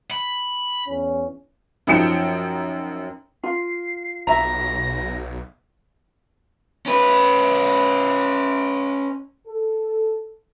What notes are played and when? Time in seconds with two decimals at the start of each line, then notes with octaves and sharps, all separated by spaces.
0.11 B5
0.87 E2 C#4
1.87 F#2 F3 D#4 G5 C#7 E7
3.44 F4 C7
4.27 B1 E5 A#5 A#6
6.86 C#4 B4
9.48 A4